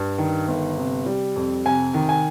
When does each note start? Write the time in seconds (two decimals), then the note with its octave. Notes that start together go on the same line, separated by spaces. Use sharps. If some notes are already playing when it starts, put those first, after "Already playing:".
Already playing: G2
0.18 D#3
0.48 G1
0.77 C3
1.06 G3
1.36 F2
1.65 C3 G#5
1.94 D#3
2.09 G#5